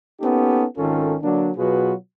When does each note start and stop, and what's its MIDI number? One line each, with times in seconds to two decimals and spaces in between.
0.21 0.64 58
0.21 0.64 59
0.21 0.64 61
0.21 0.64 63
0.21 0.64 67
0.21 0.64 69
0.78 1.15 32
0.78 1.15 51
0.78 1.15 61
0.78 1.15 65
0.78 1.15 69
1.22 1.50 50
1.22 1.50 54
1.22 1.50 58
1.22 1.50 62
1.58 1.93 47
1.58 1.93 54
1.58 1.93 65
1.58 1.93 66
1.58 1.93 68
1.58 1.93 71